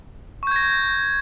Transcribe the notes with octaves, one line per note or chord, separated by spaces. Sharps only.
C#6 G6 G#6 A#6